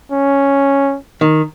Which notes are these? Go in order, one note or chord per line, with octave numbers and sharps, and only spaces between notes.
C#4
D#3